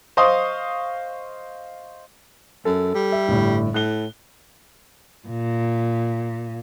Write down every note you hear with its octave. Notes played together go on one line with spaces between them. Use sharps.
C5 D#5 F5 C6 C#6 D#6
F#2 A4
G3
E5
G1 A2
A2 F#6 G7
A#2